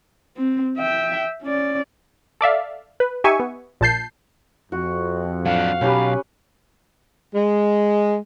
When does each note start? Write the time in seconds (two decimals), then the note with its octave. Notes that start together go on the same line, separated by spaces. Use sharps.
0.37 C4
0.77 E5 G5
1.42 C#4 D5
2.41 A4 D5 E5 F5
3.00 B4
3.24 D#4 G4 E5 G#5 C#6
3.40 B3
3.81 A#1 A#2 A5 G6 C7
4.72 F2 F#4
5.46 F#3 D4 F5 F#5
5.81 B1 C#4 G4 B4
7.35 G#3